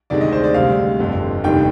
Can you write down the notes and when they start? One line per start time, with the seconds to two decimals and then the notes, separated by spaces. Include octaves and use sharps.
0.10 D2 C3 D#3 G#3 D5
0.21 D#5
0.32 C5
0.44 D5
0.54 D2 C3 G3 F5
0.99 G1 F2 D3
1.44 F1 D#2 D#3 G3 G5